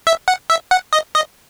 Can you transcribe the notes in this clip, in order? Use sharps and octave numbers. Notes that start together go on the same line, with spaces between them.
E5
F#5
E5
F#5
D#5
D#5